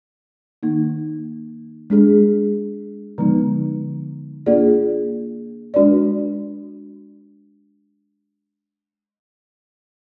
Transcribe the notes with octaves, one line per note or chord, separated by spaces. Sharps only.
D#3 A#3 D#4
G#3 D4 G#4
D3 F3 G#3 B3 D#4
A#3 D4 F4 G#4 D5
G#3 D4 F#4 B4 D5